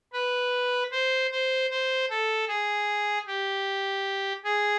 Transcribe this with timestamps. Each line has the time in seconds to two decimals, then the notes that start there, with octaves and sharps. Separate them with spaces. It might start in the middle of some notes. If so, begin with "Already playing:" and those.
0.13 B4
0.91 C5
1.31 C5
1.70 C5
2.10 A4
2.48 G#4
3.27 G4
4.44 G#4